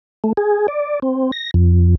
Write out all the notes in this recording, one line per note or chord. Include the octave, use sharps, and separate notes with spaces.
A3
G#4
D5
C4
A#6
F2